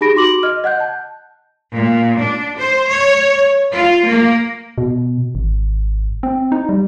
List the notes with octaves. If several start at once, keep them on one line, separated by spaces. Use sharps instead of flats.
D#4 G4 G#4 B5 A#6 D7
F#4 C6 D6 F#7
D#5 F6
D#5 F#5 F#6 G6
A5
A#2
D4
C5
C#5
F4
A#3
B2
G#1
C4
D#4
G3